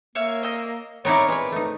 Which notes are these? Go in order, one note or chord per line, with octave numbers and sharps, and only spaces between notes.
A#3 C#5 E5 F6
D#5 E6
B3 C4 D#4 E4 A#4 C#5 D5
G#3 B4 C#5
A3 D#4